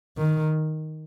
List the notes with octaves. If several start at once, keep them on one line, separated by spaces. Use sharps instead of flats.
D#3